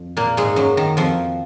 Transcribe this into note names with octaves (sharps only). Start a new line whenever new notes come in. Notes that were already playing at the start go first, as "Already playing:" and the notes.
Already playing: F2
A#2 A#3
G#2 G#3
F#2 F#3
D#3
F2 F3